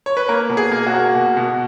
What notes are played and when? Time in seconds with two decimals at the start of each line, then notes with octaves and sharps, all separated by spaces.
0.06 C#5
0.17 B4
0.29 A#3 A#4
0.50 B2
0.57 G#4
0.72 A#3
0.87 F#4
0.94 A#3
1.15 B2
1.37 B2